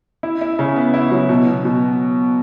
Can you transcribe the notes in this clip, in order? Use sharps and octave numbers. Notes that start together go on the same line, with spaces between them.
E4
E4
C#3
B3
E4
F#3
B2
B2
B2